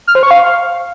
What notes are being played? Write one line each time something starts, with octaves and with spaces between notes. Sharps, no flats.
F6
C5
C#6
F5